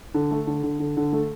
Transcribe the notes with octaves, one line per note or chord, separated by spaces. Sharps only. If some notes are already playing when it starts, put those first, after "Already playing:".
D3
A3
D3
D3
D3
D3
A3